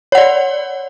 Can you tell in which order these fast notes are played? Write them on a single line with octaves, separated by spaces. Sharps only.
C#5 F#5 D5